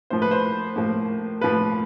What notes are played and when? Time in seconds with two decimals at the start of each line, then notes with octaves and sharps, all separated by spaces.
0.10 A2 F3 A#3 C5
0.22 B4
0.31 C5
0.76 A2 F3 A#3
1.41 A2 F3 A#3 B4